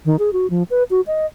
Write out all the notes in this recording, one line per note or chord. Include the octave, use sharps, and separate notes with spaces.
D#3
G#4
F#4
F3
B4
F#4
D#5